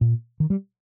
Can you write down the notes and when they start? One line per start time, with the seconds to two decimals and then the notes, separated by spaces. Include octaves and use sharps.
0.01 A#2
0.40 D#3
0.50 G3